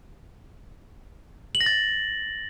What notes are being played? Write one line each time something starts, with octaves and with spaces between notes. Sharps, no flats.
F#7
A#6
A6